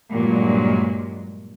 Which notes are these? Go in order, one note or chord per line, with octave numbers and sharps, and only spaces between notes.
G2 A#2 F#3 G#3